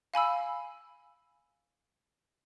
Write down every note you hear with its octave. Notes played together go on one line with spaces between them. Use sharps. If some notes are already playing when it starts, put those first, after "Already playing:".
F5 G#5 B5 E6